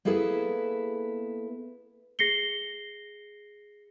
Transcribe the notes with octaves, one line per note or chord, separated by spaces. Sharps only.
A#3 B3 E4 G#4 A4 B4
G#4 A#6 C7 C#7 G7